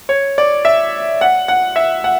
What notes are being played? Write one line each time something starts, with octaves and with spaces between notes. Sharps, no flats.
C#5
D5
E5
F#5
F#5
E5
F#5